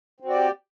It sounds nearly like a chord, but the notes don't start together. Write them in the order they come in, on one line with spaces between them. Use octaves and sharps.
C4 F#4 D5 G4